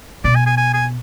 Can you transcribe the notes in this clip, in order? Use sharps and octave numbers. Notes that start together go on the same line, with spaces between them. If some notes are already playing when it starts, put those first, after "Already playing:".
B2 D5
G#5
G#5
G#5
G#5